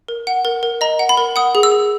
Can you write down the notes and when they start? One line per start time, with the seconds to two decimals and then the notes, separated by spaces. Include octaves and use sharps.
0.08 A#4
0.27 F#5
0.45 A#4
0.63 A#4
0.81 D#5 A#5
0.99 F#5
1.09 B5
1.17 A#4
1.36 F#5 D#6
1.55 G#4
1.63 E6
1.72 G#4